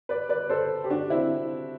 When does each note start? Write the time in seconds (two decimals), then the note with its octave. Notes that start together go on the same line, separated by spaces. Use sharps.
0.09 B4 D5
0.29 B4 D5
0.49 A4 C5
0.84 G4
0.90 D4 F#4
1.10 C4 E4